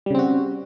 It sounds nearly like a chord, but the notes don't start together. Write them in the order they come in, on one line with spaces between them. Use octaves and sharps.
G3 C#3 C4 F#4